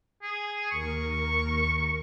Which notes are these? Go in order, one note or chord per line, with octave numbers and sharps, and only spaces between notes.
G#4
D#2 A#4 C#6